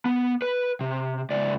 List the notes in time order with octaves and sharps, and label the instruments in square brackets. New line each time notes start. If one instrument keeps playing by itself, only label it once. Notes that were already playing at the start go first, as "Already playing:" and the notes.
[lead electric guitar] B3
B4
C3
C#2 D5